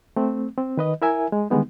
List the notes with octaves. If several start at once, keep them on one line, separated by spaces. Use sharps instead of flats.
A3 C4
C4
D#3 B4 D#5
E4 A#4 E5 G#5
G#3
D3 D#3 G3 G#3 B3 D#4